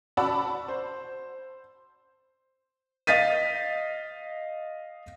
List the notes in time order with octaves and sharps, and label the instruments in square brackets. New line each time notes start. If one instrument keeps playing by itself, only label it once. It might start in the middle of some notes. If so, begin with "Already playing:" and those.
[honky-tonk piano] F#4 D5 F#5 A5 B5 E6
C5
[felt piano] D#5 F5 A6 B6 D#7